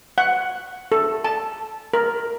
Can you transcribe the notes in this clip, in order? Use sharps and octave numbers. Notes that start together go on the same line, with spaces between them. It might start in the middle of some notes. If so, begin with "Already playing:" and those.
F#5
A4
A5
A#4